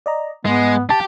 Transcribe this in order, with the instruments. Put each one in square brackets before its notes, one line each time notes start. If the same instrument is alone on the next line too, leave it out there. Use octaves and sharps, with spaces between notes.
[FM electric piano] D5 D#5 A#5
[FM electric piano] G#2 [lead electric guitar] G#3 [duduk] B3
[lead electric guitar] G4 [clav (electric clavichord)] A5